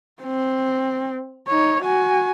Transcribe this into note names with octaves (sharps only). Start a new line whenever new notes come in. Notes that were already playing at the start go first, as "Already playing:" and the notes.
C4
D#4 C#5
F#4 G#5